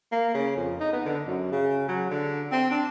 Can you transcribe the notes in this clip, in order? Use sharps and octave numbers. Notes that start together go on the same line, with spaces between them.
A#3
C#3
F2
D#4
B3
D3
F#2
C#3
F#3
D3
C4
D4